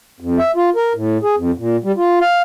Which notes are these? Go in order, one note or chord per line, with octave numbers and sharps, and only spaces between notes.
F2
E5
F4
A#4
A2
G#4
F2
A#2
G3
F4
F5